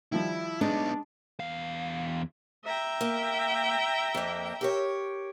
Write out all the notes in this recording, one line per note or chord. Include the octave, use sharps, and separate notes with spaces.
D#3 F3 G3 E4
G#3 B3 D4 D#4
E2 F5
E5 G5 A#5
A#3
F2 A#3
G4 A#4 C#5